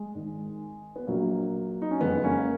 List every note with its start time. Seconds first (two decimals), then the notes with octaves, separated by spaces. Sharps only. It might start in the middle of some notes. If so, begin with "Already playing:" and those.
Already playing: G#3
0.15 G#1 G#2 D#3
0.96 B3
1.07 A#1 A#2 F#3 A#3
1.82 D#4
1.91 C#4
2.01 F#1 F2 C#3 G#3 B3
2.24 A#3 C#4